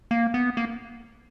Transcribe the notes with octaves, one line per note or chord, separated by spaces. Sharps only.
A#3
B3
A#3